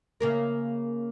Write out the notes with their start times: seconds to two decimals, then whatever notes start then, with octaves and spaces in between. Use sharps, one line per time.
0.20 C#3 A#3 A#4